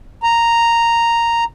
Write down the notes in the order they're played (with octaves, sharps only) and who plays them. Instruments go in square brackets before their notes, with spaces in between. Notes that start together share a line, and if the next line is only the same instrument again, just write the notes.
[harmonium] A#5